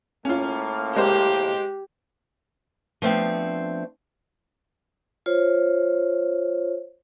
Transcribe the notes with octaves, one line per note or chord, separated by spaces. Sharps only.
A2 A#3 C#4 F4
G#3 G4 C5
F3 A3 B3 C4 D4
F4 C5 C#5